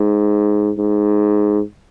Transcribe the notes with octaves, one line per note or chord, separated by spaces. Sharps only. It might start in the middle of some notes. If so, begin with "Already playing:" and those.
Already playing: G#2
G#2